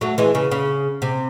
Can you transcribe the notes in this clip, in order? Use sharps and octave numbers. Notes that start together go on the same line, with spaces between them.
F#3 A3
E3 G#3
C#3
C#3
C3